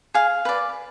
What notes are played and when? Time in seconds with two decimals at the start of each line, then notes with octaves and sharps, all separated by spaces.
0.14 G#4 F5
0.45 B4 D5